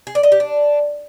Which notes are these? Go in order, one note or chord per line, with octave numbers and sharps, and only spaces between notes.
G#4
D5
D#5
G4
D4